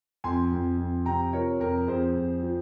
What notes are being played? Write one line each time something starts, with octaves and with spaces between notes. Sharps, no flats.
F2 G#5 C6
F2
F2
C3 G5 A#5
F3 A#4 C#5
F2 A#4
F2 G#4 C5
F2
F3